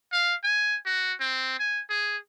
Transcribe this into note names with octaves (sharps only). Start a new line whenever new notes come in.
F5
G#5
F#4
C4
G#5
G#4